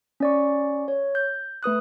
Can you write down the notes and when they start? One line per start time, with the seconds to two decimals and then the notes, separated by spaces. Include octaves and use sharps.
0.20 C#4 D5 C#6
0.88 C#5
1.15 G6
1.63 A3 B4 D#6 F#6